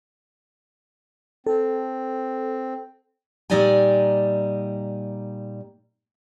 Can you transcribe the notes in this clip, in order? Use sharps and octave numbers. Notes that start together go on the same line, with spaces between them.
C4 A4
A#2 G3 D#4 D5 D#5 G#5